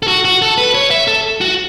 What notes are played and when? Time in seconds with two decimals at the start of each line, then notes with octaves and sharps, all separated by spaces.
0.03 A4
0.08 F#4
0.25 F#4
0.42 A4
0.58 B4
0.75 C#5
0.90 E5
1.08 A4
1.41 F#4